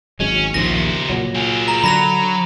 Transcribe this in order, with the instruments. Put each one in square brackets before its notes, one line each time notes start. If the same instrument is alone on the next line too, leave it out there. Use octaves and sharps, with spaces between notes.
[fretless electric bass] G#1 F#3 G#3 [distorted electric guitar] C#4
[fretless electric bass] A#1 D#2 A#2 [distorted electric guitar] C#3 C5 [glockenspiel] A#6
[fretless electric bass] A#2 F#3
[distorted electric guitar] F4 G#4
[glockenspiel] A#5
[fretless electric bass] D3 [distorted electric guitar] F#3 [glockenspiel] B5 A#6 F7